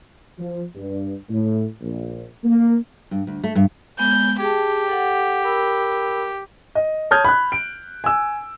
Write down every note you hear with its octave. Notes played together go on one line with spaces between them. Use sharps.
F3
G2
A2
A#1
A#3
G2
D2
A3
G2
G#3 B3 G6
G4 G#4 G5 A5
A4 F#5
A#4 B5 E6
D#5
C#5 A5 D#6 F6 G6 G#6
B5 F#6
D7
G#5 E6